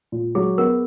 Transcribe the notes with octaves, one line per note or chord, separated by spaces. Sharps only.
A#2
F#3 G#4
B3 A#4